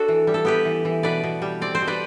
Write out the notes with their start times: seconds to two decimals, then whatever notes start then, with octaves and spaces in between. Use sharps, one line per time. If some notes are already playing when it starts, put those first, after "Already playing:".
Already playing: D4 F#4 A4
0.08 E3
0.27 G3
0.34 A4
0.45 B3 G4 B4
0.65 E3
0.85 E3
1.03 B2 B4 D5
1.23 B2
1.42 G3
1.61 C4 D5
1.75 C5
1.81 B2
1.87 B4 D5